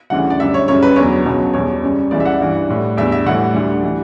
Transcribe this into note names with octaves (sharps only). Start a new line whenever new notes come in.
D2 C#3 E3 G3 F#5
D5
F#2 D3 G3 E5
C#5
F#2 C#3 G3 C#5
B4
E2 D3 F#3 C#5
C#2 B2 F#3
E2 B2 G3 C#5
F#2 C#3 G3
C#2 C#3 E3 G3 D5
E5
F#5
G2 E3 G3
A2 G3
E2 D3 G3 E5
E5
A2 E3 G3 F#5
D2 D3 G3
E3 G3